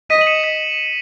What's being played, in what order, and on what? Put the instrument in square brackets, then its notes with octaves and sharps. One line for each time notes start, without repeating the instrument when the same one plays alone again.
[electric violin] D#5 [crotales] B6 D#7
[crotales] F#7
C#7 E7
B6